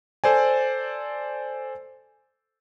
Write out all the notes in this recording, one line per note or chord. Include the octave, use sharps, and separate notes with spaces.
A4 C5 D5 G#5